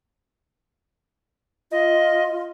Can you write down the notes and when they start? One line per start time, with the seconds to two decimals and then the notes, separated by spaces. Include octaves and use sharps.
1.72 F4 D#5